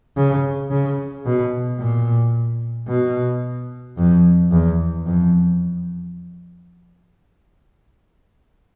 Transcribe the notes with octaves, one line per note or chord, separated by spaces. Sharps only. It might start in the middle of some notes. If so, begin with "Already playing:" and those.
C#3
C#3
B2
A#2
B2
F2
E2
F2